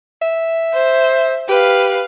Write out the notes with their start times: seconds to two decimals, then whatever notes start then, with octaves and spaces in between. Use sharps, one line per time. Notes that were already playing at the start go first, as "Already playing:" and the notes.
0.22 E5
0.74 C5
1.49 G4 B4 F5